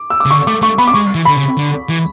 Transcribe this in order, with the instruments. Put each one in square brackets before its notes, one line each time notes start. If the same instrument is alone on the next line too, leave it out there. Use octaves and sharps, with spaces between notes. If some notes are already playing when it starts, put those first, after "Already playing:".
Already playing: [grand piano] D6
E6
D6
[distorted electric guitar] C#3
[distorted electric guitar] D3 [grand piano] C#6
[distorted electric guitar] A3 [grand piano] D6
[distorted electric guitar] A3 [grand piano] C#6
[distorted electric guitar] B3 [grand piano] B5
[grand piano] D6
[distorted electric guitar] G#3 [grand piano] C#6
[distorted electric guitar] E3
[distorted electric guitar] D3 [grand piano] B5
[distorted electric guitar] C#3
D3
E3